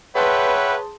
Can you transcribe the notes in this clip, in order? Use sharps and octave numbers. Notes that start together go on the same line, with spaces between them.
G#4 B4 C#5 E5 F#5 G5 A5 C6